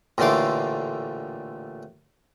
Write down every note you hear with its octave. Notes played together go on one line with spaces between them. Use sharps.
A1 A#2 D3 A3 C6 D6